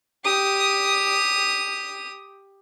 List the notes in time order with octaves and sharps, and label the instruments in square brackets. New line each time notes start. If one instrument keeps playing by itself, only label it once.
[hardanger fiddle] G4 D#6